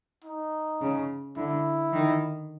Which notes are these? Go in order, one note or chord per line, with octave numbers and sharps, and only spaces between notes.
D#4
C#3
D3 E4
D#3